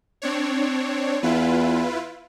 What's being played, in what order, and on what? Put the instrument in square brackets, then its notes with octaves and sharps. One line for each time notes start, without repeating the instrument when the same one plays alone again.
[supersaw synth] C4 D4 C#5
[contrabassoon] E2 [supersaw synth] E4 F4 B4